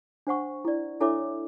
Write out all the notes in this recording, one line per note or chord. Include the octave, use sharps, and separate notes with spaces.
D4 C5 F#5 C#6
E4 D5
D4 E4 A4 C#5 E5 D6